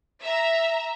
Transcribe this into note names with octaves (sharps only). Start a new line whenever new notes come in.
E5 A#5